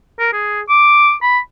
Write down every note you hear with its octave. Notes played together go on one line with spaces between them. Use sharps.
A#4
G#4
D6
B5